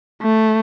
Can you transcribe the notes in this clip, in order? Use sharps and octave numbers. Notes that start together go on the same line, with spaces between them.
A3